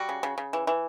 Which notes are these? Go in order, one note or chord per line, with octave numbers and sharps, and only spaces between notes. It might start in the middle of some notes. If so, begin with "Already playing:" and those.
Already playing: G3 F#4
C#3
C#3
C#3
E3
E3